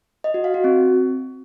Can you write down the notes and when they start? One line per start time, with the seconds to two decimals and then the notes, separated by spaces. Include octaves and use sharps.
0.24 D#5
0.34 F#4
0.44 F5
0.54 F#4
0.64 C4